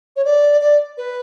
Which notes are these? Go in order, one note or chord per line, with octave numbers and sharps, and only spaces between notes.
C#5
D5
D5
B4